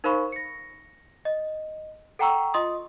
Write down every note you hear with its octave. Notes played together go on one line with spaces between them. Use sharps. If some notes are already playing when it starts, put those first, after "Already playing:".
D#4 A#4 C5 F5 B5 C#6
A#6 C#7
D#5
A4 F#5 G5 A#5 C#6 E6
F4 D#5 C6 D#6